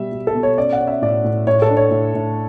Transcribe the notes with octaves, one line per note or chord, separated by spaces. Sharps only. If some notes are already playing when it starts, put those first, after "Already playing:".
Already playing: B2 G3 E5
G3
A4
B2
C#5
C#4 D5
F#5
C#4
E5
A2 D5
A2
A2 C#5
A4
D4
C#5
A2
A2